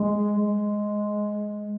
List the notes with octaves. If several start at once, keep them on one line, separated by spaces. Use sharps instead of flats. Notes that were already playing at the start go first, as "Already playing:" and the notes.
Already playing: G#3
G#3